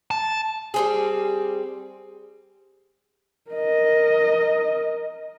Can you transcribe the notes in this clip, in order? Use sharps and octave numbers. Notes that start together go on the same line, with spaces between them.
A5
G3 C4 G#4
A#4 D#5